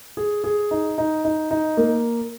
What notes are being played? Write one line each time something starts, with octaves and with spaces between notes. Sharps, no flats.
G#4
G#4
D#4
D#4
D#4
D#4
A#3